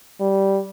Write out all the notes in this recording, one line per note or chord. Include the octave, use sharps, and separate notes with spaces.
G3